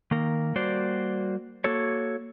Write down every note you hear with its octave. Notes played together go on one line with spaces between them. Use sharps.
D#3 A#3 A#4
G3 A#3 F#4 C5 D5
A#3 F#4 A4 C#5